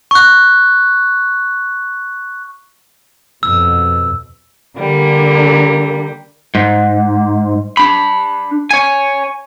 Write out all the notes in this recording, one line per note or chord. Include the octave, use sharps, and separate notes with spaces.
C#6 F#6
F2 B2 E6
D3 G3 A#3
G#2
D4 B5
C#5 G#5